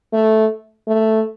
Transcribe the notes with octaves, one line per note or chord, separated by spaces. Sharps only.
A3
A3